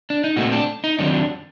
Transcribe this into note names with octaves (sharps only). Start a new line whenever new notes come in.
D4
D#4
A#2 A3 C4 F#4
D4
D#4
F#2 D#3 F#3 C4 D4
D4